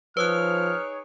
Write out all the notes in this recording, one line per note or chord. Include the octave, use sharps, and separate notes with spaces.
F3 D#4 G#4 B4 C#5 D#6 F6 F#6